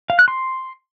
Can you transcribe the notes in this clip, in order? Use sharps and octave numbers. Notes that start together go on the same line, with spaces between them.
F5
F#6
C6